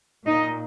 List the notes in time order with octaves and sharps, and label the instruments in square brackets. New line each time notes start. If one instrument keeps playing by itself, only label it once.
[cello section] A#2 A#3 D#4 D#5